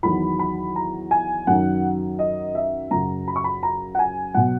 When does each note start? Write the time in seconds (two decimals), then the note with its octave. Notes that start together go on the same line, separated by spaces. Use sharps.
0.03 E2 D#3 F#3 B5
0.39 B5
0.76 A#5
1.11 G#5
1.47 F#2 D#3 F#3 F#5
2.19 D#5
2.55 E5
2.91 F#2 C#3 F#3 A#5
3.28 B5
3.36 C#6
3.44 B5
3.63 A#5
3.95 F#5
3.99 G#5
4.34 B2 F#3 F#5